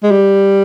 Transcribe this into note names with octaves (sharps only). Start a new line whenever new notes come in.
G#3
G3